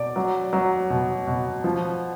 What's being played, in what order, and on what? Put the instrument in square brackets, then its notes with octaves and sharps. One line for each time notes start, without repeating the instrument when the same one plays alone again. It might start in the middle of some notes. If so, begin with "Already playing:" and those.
Already playing: [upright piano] B2 D5
F#3
F#3
B2
B2
F3